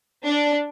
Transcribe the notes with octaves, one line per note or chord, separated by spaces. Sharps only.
D4